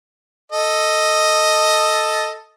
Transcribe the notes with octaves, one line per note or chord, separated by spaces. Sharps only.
A4 D#5